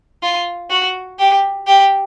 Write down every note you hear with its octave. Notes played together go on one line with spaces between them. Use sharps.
F4
F#4
G4
G4